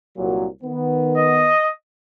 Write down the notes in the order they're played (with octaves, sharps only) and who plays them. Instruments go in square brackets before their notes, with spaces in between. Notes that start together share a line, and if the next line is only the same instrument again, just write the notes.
[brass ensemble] C2 A#2 F#3
D#3 B3
[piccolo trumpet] D#5